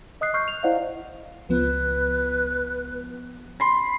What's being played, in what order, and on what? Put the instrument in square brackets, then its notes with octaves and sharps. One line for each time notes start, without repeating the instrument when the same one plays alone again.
[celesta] D#5 D#6 F#6 C7
C#6 F6 G6 C7
F7
E4 C5 D5 D#5 F5 F#5
[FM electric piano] C#2 F3 B3 [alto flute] B4
[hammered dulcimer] B5 C6